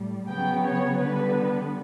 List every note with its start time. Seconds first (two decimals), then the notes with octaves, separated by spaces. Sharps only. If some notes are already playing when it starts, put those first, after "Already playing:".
Already playing: A2 G3
0.29 C#3 F#3 B3 G5
0.64 C#5
1.00 D3 G3 B3 B4